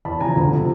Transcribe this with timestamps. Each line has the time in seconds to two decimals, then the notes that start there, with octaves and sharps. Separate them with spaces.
0.05 E2 A5 B5
0.21 C#3 F3 G#5 A#5
0.36 D2
0.52 C3 F3